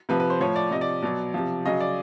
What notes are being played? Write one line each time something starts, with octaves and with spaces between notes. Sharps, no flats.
C3 F3 B4
B4
C5
A2 F3 C#5
D5
C3 F3 D#5
D5
B2 F#3 D5
C3 F3
C#3 F#3 D#5
D5